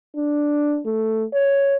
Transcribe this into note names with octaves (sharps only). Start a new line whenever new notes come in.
D4
A3
C#5